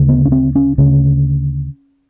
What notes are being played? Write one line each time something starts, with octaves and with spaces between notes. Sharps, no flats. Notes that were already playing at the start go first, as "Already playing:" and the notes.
Already playing: D2 C#3
B3
C#4
C4
C#4
D2 C#3 C#4